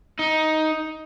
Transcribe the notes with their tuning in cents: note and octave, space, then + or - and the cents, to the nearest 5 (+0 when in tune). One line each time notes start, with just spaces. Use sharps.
D#4 +10